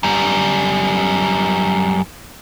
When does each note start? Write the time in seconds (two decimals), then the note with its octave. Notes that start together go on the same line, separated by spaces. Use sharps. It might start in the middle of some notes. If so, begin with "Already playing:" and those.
0.03 F#2 G3